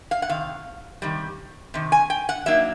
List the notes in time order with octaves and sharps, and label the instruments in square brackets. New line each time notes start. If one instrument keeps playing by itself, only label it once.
[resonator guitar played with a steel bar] F5
F#5
C3 D#3 F5
C3 D#3 G3
C3 D#3
G#5
G5
F#5
F#3 A#3 D#4 E5